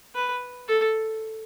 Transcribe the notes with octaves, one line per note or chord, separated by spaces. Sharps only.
B4
A4